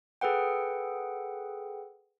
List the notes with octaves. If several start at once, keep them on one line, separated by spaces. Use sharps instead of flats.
G#4 A4 B4 F#5 G5